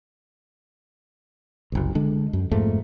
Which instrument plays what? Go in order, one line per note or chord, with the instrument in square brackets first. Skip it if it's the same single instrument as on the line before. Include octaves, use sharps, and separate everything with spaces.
[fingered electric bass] F#1 C2
D3 G#3 D4
F#2
F2 G#2 A3 A#3